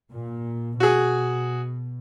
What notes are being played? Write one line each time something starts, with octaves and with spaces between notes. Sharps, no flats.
A#2
B2 F#4 G#4